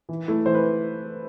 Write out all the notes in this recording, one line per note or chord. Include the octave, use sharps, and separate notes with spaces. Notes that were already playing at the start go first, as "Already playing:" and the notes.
E3
A3 E4
E3 C5
B4